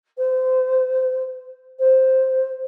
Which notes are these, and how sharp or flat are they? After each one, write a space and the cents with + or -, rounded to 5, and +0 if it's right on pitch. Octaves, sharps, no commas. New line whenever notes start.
C5 -25
C5 +0